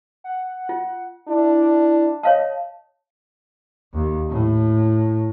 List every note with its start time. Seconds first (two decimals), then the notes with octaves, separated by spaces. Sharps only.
0.24 F#5
0.69 F4
1.28 D4 E4
2.23 C#5 D#5 F5 A5
3.94 D#2
4.30 A2